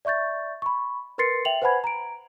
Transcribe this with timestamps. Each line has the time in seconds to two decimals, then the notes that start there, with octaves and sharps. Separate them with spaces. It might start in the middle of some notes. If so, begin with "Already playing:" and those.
0.05 D5 E5 C#6 G6 A6
0.62 B5 C#6
1.18 A#4 B4 C6 A6 C7 C#7
1.45 E5 G5 F7 F#7
1.62 B4 C5 F#5 G#5 B5 G#6
1.84 A#5 D7